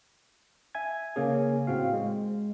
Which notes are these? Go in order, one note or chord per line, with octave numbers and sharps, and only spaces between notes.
E5 G#5 G#6
C#3 A#3 C#4 G#4
A2 C4 F#4 F5
G#3